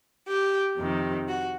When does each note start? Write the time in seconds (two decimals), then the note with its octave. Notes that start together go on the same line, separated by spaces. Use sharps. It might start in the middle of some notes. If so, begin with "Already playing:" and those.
0.27 G4
0.78 F2 C3 D#3
1.28 F#4